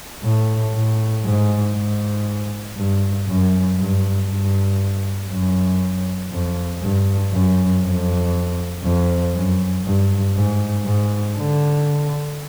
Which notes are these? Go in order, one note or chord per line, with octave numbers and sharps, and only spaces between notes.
A2
A2
G#2
G#2
G2
F#2
G2
G2
F#2
F2
G2
F#2
F2
F2
F#2
G2
G#2
G#2
D3